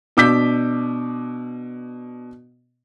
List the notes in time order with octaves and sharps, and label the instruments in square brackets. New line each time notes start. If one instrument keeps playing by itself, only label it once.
[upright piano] B2 D4 D6 E6 G6 B6